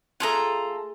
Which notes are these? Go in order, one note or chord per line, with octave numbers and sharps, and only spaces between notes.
A3 F4 G#4 A4 F#5 A#5